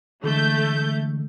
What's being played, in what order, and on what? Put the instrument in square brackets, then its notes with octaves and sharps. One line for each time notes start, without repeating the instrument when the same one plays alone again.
[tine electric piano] D3 E3 G#3 [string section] A3 G6